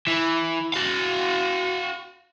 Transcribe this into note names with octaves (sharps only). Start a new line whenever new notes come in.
E3
F#4 F5